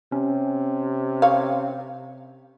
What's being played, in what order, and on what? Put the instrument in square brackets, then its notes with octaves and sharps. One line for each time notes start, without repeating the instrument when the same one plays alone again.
[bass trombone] C3 [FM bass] C#4
[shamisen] C#5 F5